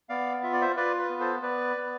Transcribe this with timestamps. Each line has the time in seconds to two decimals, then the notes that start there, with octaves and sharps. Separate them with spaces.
0.09 B3 D5 F5
0.43 F4 E5
0.53 D5
0.61 C5 E5
0.76 F4 B4 D5
0.99 B4
1.09 B3
1.20 A4 C5
1.42 B3 B4 D5
1.76 B3